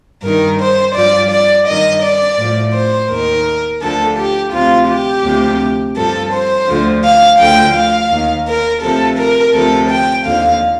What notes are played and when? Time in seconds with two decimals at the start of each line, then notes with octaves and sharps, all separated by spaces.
0.24 G2 D#3 A#4
0.60 C5
0.95 G2 F3 D5
1.31 D5
1.67 G2 D#3 D#5
2.03 D5
2.39 A2 F3
2.74 C5
3.10 D#2 D#3 A#4
3.82 D2 D3 F3 A4
4.18 G4
4.53 D2 C3 F3 F4
4.89 G4
5.25 D2 C3 F3
5.96 G2 F3 A4
6.33 C5
6.68 D2 D3 F3
7.03 F5
7.39 D2 D3 F3 G5
7.76 F5
8.11 D#2 D#3
8.47 A#4
8.82 D2 C3 F3 A4
9.18 A#4
9.54 D2 C3 F3 A4
9.91 G5
10.26 D#2 D3 F3 F5